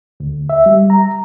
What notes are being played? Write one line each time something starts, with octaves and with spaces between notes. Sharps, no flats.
D2
E5
G3
A#5